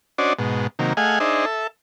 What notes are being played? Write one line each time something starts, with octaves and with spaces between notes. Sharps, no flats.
C#4 D4 F#4 C5 D5 D#5
G#2 B2
C3 D#3 F#3 A#3
A3 G#4 D#5 F5 F#5 G#5
D4 D#4 G#4 C5 D#5 E5
A4 E5